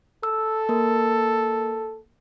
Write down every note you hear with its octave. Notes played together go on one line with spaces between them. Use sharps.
A4 E6
A#3 A#4